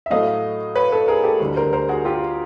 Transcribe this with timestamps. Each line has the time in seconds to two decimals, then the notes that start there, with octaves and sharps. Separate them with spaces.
0.06 E5
0.10 A2 F#3 A3 D#5 F5
0.75 B4 C#5
0.92 A4 B4
1.08 G#4 A#4
1.24 G4 A4
1.40 D2 D3 G3
1.56 A#4 C5
1.73 A#4 C5
1.89 F#4 G#4
2.05 F4 G4